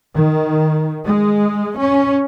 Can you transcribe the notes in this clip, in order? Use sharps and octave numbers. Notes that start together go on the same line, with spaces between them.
D#3
G#3
C#4